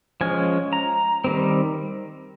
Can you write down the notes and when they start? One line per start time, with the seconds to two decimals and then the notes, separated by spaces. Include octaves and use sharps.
0.21 F3 G#3 C#4 G#5
0.73 A#5
1.24 D#3 G3 C4